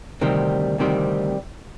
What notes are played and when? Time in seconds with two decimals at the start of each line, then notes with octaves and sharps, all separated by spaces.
0.21 D2 C3 D#3 G3 C4
0.78 D2 C3 D#3 G3 C4